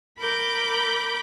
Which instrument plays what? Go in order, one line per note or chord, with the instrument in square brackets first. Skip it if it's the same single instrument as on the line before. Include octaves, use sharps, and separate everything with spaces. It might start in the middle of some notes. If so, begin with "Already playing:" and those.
[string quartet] A#4 B5 D6 G6